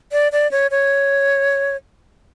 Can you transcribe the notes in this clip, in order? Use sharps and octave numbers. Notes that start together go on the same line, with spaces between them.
D5
D5
C#5
C#5